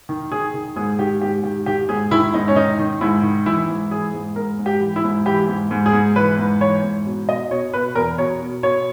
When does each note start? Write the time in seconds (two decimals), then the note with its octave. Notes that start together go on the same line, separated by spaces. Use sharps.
0.09 D#3
0.32 D#3 G#4
0.54 D#3
0.76 G#2 G#4
0.99 D#3 G4
1.21 G#2 G4
1.43 D#3 G4
1.66 D#3 G4
1.89 G#2 G#4
2.11 D#3 E4
2.34 G#2 D#4
2.48 C#4
2.56 D#3 D#4
2.79 D#3
3.01 G#2 E4
3.23 D#3
3.46 E3 E4
3.68 G#2
3.91 E3 G#4
4.14 G#2
4.36 G#2 A#4
4.59 G#2
4.66 G4
4.81 E3
4.96 E4
5.04 G#2
5.26 E3 G4
5.48 G#2
5.71 G#2
5.86 G#4
5.93 G#2
6.16 E3 B4
6.38 G#2
6.61 E3 C#5
6.83 G#2
7.06 B2
7.28 B2 D#5
7.51 B2 C#5
7.73 B2 B4
7.95 E2 A#4
8.18 B2 C#5
8.41 B2
8.63 B2 C#5